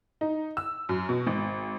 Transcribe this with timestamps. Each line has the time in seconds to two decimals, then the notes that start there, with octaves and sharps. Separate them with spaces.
0.21 D#4
0.57 E6
0.89 F#2
1.09 B2
1.27 G#1